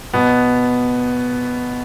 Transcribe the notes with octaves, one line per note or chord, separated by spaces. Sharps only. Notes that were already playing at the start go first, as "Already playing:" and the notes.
B2 B3